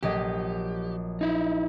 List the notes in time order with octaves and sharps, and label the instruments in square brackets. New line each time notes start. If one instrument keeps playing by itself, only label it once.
[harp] A#1 F#3 D#5 [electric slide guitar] G4
[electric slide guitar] D#4 E4